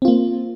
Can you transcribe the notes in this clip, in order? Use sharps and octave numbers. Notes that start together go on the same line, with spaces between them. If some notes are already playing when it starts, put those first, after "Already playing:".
A#3 C4 F4